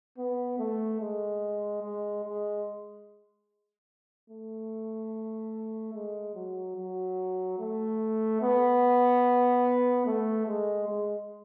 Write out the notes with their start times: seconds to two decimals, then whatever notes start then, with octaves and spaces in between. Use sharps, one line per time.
0.18 B3
0.59 A3
1.01 G#3
1.82 G#3
2.24 G#3
4.30 A3
5.94 G#3
6.35 F#3
6.77 F#3
7.59 A3
8.42 B3
10.06 A3
10.47 G#3
10.88 G#3